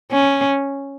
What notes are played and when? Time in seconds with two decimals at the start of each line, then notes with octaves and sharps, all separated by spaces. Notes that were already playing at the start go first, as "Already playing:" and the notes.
0.12 C#4